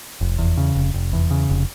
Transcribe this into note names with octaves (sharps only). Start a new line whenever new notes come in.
F1
E2
C#3
F1
F1
E2
C#3
F1